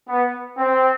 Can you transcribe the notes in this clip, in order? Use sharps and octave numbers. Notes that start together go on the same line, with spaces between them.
B3
C4